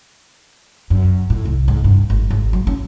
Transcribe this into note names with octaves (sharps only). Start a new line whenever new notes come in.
F#2
A2
C2
G#2
G2
G#1
G#1
F#3
C#4